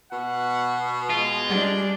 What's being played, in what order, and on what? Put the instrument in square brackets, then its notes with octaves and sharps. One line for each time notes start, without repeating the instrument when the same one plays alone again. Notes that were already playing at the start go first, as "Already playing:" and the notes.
[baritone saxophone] B2 [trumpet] F#5
[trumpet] G#3 [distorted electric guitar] F4
[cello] G3 D4